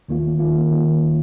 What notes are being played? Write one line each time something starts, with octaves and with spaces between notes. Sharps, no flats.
D#2 D#3 A#3 F4
D#2 D#3 A#3 F4
D#3